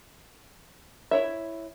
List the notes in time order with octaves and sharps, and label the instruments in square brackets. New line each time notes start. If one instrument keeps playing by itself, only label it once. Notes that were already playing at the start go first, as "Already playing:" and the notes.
[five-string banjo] E4 C#5 E5